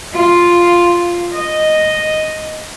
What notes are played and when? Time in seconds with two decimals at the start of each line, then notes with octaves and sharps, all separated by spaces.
0.13 F4
1.32 D#5